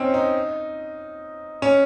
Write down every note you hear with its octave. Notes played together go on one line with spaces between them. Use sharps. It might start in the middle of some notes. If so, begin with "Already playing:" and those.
Already playing: C4 C#4 D#4
D#4
C#4